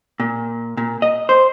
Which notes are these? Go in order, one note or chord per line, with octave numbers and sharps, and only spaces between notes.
A#2
A#2
D#5
C5